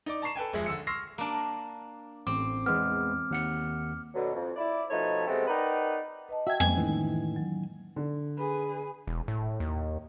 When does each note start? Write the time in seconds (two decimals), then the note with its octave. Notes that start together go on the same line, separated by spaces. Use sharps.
0.06 D#4 D5 D6
0.22 A5 A#5 C#6 C7 E7
0.36 A4 B4 G5 G#5
0.53 D#1 F2 G#3 G#4 E5
0.66 D3 E6 C#7
0.87 C6 C#6 E6 F6 A#6 C7
1.18 A#3 D4
2.27 A1 C4 D6
2.66 E2 G#3 B3 F6
3.31 D#2 F#5 C#7
4.15 B2 D3 F#3
4.34 F2
4.57 E4 D5
4.90 B2 F3 A3 D#4 C#5 E5
5.27 C3 G#3 A3 B3 C4
5.48 D#4 A#4 B4 D5 F#5 G5
6.29 B4 D#5 A5
6.47 F#4 E5 G5 A5 G#6
6.60 F2 G3 G#3 A#3 B3 C#4 G#5
6.77 A2 D#3 E3 D#4
7.36 F#3
7.96 D3
8.38 G#4 B4
9.07 E1
9.28 A2
9.60 D#2